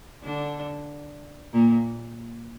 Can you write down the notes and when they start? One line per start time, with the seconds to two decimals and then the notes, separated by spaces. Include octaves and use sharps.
0.24 D3 D4
1.53 A#2 A#3